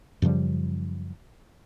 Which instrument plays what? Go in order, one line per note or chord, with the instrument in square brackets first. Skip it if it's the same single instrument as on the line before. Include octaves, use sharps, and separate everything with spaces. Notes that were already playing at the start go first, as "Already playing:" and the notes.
[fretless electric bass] F#2 C#3 F3 G3